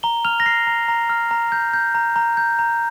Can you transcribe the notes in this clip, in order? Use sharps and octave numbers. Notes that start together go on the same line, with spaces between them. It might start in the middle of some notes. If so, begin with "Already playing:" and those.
A#5 G7
F6 F7
A#6
F6 C7
A#5
A#5
F6
A#5
G6
G6
A#5
A#5
G6
A#5